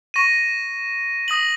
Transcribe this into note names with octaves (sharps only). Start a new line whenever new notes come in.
C#6 A#6 D#7
D#6 A#6 F#7